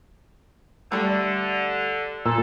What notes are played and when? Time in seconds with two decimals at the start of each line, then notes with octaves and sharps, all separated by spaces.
0.92 D3 G3 A3
2.26 A#2 A4